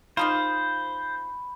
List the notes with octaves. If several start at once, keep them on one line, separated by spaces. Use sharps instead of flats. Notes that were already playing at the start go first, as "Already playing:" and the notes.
D#3 D#4 F4 C5 B5